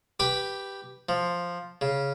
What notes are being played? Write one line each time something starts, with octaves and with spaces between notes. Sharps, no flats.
G4 B4 G5 B5
F3
C#3